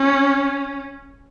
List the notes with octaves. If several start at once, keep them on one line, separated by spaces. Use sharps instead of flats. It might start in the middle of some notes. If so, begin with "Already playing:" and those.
Already playing: C#4